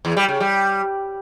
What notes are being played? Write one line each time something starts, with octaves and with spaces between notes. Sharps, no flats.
E2
G3
C#3
G3